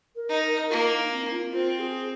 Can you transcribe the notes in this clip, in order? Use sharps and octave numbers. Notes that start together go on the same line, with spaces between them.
A#4
D#4
A#4
A#3 F4
D#4
D#4
C4
F4
C4 F4
G#4